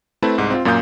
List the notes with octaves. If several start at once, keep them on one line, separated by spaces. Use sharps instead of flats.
A3 C4 E4 B4 E5 A5
C2 G#2
C4 F4
F#2 A#2 A#3 F5 D#6 G6